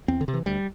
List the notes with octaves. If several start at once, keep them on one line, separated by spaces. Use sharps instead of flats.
E2 C4
D3
C3
E3
D2 G3